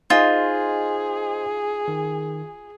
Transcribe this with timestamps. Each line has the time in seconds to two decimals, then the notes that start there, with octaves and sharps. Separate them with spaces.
0.10 D#4 F4 G#4 C5 D#5 G#5
1.88 D#3